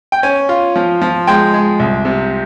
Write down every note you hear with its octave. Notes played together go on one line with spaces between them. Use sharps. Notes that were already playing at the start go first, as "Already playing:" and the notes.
G5
C#4 G#5
F4
F3
F3
G#3 G5
G#3
C2
C3